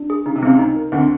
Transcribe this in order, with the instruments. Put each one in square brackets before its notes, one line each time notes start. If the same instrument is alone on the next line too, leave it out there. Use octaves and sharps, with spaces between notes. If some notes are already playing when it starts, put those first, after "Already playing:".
Already playing: [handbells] D4
G#4
[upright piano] C#3 [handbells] D#4
[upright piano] C3
[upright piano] C#2 C#3 [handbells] C4
[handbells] D#4
A#4
[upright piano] D2 D3 [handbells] C4